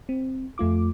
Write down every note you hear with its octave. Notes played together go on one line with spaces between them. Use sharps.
C4
F2 A3 F4 D6